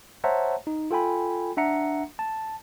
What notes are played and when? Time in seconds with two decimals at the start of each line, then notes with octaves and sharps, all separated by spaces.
0.24 C5 C#5 E5 F#5 A5 A#5
0.67 D#4
0.91 F4 A4 G5 G#5 B5
1.57 D4 E5 F#5 A#5 C#7
2.19 A5